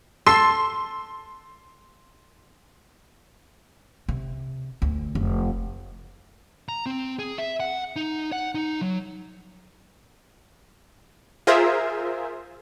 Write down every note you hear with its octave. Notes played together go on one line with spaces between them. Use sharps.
A4 C6 C7
C3
D2
F1
A#5
C4
G#4
E5
F#5
D#4
F#5
D#4
F#3
F4 G#4 A#4 C5 E5